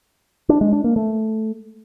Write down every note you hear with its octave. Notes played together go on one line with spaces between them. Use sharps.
D4
G#3
D4
A#3
A3